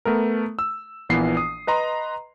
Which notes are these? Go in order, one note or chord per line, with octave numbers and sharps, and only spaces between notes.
A3 B3 A#4
E6
A#1 A#2 E3 B3 C7
D#6
B4 D#5 A#5 C6